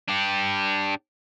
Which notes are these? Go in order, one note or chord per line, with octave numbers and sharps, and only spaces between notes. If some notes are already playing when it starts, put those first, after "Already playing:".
D4 G4